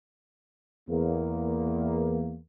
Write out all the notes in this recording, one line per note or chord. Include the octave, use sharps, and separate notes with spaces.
E2 A#3